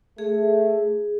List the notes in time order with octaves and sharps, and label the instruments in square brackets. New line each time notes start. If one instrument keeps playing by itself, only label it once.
[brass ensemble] A3 [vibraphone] G#4